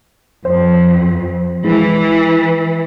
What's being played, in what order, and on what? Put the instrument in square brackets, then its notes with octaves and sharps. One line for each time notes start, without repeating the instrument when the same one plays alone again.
[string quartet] F2 [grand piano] C5
[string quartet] E3 [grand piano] G#3 E4